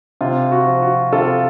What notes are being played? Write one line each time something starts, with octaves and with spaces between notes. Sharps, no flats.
C3 F4
F#4
F3
F#4
C3 F4 A4